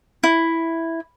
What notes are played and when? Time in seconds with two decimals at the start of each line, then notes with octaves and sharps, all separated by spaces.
0.23 E4